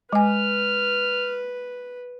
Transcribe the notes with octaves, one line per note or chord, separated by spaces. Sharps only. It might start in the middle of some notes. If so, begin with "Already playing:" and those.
G#3 B4 G#5 F6